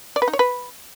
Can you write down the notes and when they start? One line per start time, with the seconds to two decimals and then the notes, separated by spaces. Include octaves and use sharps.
0.16 D5
0.22 B4
0.28 D#4
0.33 C#5
0.39 B4